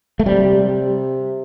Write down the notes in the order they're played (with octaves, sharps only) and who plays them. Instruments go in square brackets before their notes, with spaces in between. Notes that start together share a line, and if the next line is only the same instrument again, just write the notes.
[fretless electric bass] A3
[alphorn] C3 [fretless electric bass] G3